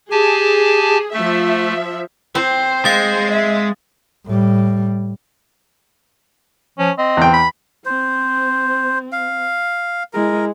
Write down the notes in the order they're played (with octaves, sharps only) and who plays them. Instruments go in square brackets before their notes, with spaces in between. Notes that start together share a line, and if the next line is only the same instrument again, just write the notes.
[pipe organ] G4 G#5 A5 [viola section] G#4
[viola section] F3 E5 [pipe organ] A3
[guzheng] C4 [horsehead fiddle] C5
[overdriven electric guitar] G#3 [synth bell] F5 A6
[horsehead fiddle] E5
[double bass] A2 G3
[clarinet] F3 [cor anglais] C#4
[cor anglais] C4 [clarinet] D#5
[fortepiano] E2 G5
[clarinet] B5
[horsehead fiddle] C4 [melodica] C5
[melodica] F5
[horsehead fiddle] G#3 E4 [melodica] A#4